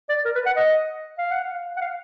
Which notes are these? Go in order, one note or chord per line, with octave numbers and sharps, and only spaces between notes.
D5
A#4
B4
F#5
D#5
F5
F#5
F5
F#5
F5